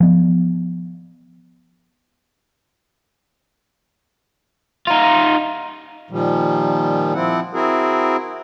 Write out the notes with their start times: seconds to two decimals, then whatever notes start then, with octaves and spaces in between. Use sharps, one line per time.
0.01 F3 B3
4.87 D#4 F4
6.11 A#2 D#3 F3 G3
7.14 F3 C4 E4 F#5
7.54 C4 E4 F#4 G#4 A#4